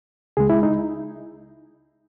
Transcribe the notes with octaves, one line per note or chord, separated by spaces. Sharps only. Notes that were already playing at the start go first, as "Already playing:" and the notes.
C#2 C#3 G#3 G#4
E4
D#4